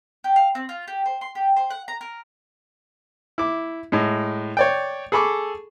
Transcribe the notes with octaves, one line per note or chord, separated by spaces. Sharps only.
G4
F5
C4
F4
G4
C5
C6
G4
C5
F#5
A#5
A#4
E4 D6
A2 G#3
C#5 D5 G5
G#4 A4 B5 C#6 D6